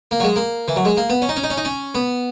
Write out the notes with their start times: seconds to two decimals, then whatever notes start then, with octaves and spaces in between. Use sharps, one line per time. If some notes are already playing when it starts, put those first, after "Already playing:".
0.11 A#3
0.20 F#3
0.24 G#3
0.36 A#3
0.68 E3
0.76 F#3
0.85 G#3
0.97 A#3
1.10 B3
1.22 C#4
1.29 D#4
1.36 C#4
1.44 D#4
1.50 C#4
1.57 D#4
1.65 C#4
1.95 B3